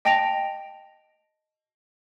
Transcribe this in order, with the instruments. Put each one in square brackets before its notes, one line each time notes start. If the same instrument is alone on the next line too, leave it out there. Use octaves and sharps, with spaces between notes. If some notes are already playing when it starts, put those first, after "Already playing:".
[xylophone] D#5 G5 A5 A#6 D7 F7